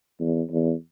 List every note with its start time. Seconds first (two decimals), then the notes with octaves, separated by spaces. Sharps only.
0.20 E2
0.51 E2